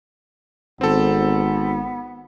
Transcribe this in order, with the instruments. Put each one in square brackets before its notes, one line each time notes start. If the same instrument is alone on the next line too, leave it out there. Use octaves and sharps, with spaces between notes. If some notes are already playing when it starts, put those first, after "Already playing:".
[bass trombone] G#1 [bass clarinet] B3 [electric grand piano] C4 A4